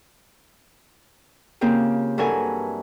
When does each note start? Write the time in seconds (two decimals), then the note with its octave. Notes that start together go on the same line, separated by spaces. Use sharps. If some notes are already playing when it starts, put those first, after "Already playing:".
1.61 C#3 A#3 C4 F4 G4
2.18 G2 E3 F#3 A4 A#4 G#5